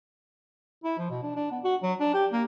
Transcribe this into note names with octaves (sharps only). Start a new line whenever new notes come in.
E4
F3
B2
D4
D4
B3
F#4
F#3
D4
G4
A#3